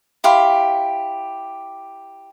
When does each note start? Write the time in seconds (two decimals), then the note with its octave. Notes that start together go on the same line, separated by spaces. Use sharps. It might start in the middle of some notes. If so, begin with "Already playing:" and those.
0.24 E4 G4 F5 C6